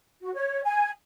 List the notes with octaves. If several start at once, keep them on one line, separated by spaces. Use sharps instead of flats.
F#4
C#5
G#5